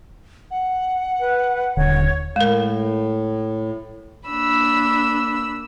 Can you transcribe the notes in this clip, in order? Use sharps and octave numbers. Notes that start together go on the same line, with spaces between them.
F#5
B4
D#1 D3 C#5
A2 G#3 A#4
A#3 D4 B5 E6